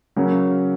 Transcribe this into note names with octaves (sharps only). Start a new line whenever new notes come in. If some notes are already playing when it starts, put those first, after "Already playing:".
C#3 F#3 A#3 C#4